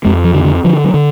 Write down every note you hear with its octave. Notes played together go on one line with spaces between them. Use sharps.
F2 G#3
F3
D3
D3
D3 F3
F#3
D3